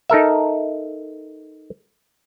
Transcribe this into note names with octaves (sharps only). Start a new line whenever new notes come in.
D#4 A4 A#4 E5